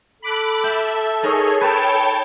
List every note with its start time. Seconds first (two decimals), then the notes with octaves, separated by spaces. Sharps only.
0.22 A4 B5 D6 F#6
0.64 E5 G5
1.23 D#4 G#4 A#4 C#5
1.61 B4 C#5 G5 A5